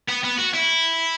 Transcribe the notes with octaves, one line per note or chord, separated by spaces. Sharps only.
B3
B3
F#4
E4